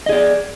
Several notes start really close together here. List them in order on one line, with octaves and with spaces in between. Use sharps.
D#5 G#4 D5